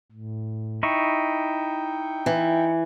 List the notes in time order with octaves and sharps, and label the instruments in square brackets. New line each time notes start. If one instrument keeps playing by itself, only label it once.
[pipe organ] A2
[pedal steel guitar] D#4 E4 C#6 [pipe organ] G5
[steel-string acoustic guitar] E3